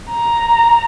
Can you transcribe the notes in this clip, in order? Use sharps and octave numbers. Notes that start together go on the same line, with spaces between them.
A#5